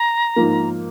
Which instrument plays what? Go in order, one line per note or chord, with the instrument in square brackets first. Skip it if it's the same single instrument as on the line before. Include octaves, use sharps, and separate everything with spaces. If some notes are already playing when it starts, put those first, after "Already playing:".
Already playing: [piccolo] A#5
[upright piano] G#2 F3 A#3